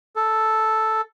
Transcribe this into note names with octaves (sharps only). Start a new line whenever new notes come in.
A4